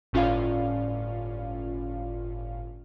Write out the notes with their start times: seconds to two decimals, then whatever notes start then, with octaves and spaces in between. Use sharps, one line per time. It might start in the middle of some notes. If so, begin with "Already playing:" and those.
0.13 G1 A2 C#4 F4 D5 F5